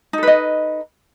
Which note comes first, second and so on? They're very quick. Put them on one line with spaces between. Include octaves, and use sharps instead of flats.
D#4 A4 B4 D#5